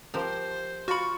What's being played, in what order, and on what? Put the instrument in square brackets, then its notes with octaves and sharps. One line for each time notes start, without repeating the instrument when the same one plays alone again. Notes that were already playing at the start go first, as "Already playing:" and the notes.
[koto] F3 G4 A#4 [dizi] C5
[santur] F4 C#6 [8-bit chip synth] F#4 B5